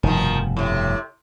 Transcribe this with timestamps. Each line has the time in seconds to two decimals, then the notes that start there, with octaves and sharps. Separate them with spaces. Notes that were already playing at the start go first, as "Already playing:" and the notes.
0.03 F1 G2 B2 D#3 F3
0.57 A2 C3